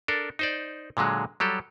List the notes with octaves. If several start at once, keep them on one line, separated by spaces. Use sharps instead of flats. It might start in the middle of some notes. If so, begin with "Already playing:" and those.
D4 A4 A#4
D#4 C5 D5
A#2 D3 F#3 G#3
F#3 G3 G4 A4